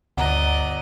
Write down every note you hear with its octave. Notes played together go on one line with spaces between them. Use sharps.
G1 D2 D5 D#5 F#5 A#5 F#6